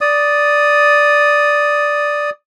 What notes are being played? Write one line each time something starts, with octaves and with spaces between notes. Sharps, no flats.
D5 D#6